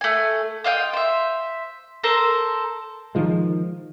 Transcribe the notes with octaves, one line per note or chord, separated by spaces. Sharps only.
A3 G#5
F4 D#5 F5 G5
C5 E5
A4 A#4 C5 A#5
D#3 F3 G#3